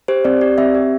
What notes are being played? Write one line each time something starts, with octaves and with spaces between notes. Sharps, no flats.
G4 C5
C4 D5
G4 D5
C4 E5
G4